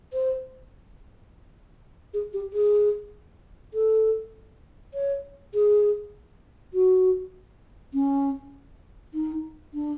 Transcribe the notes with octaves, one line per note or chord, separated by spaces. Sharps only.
C5
G#4
G4
G#4
A4
C#5
G#4
F#4
C#4
D#4
D4